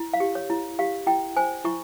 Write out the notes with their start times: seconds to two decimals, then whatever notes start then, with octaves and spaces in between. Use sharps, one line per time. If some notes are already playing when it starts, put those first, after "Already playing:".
Already playing: E4
0.14 F5
0.20 G4
0.35 C#5
0.50 E4
0.79 G4 F5
1.07 E4 G5
1.37 C5 G#5
1.64 E4 C#6